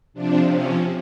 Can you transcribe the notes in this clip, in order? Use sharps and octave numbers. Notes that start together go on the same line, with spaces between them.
C3 F3 D4
C3 F3 C#4